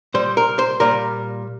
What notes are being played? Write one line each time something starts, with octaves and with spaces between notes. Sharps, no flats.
A#2 G3 C5
A#4
C5
A#2 G3 A#4